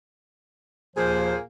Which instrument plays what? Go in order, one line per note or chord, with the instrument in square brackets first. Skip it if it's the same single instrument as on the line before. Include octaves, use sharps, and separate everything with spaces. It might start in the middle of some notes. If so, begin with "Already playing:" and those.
[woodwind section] D#2 F3 C5 [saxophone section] A#2 A#3 G#4